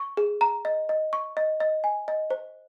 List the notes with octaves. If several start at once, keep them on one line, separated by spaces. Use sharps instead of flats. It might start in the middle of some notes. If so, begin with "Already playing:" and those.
Already playing: C#6
G#4
A#5
D#5
D#5
C#6
D#5
D#5
G#5
D#5
C5